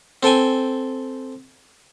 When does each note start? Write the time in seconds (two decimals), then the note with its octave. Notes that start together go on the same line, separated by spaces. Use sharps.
0.23 C4 A4 G5 G#5